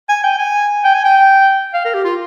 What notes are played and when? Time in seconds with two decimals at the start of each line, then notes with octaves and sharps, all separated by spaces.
0.09 G#5
0.24 G5
0.39 G#5
0.84 G5
0.94 G#5
1.05 G5
1.74 F5
1.85 A#4
1.94 G4
2.04 F4